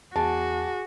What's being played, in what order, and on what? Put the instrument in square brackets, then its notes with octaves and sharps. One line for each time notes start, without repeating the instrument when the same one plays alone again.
[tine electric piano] E2 [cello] F#4 [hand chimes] G#4 F#5 G#5 [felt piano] A5